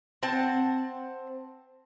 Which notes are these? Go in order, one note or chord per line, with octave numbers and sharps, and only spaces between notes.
C4 F#5 A5